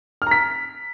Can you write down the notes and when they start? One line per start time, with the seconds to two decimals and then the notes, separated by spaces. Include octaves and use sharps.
0.22 F6
0.27 A#5
0.31 B6